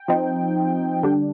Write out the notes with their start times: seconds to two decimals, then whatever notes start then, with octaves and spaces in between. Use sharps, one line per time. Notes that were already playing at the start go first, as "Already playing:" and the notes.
Already playing: G5
0.08 F3 C4 D#4
1.03 D3 G3 D4